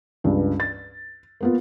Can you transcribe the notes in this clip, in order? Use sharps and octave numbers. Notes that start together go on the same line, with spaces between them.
C#2 G2
A6
A#3 B3 F4